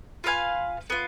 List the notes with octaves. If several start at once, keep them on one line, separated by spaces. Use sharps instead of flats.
F4 B4 F5 G#5
B3 F4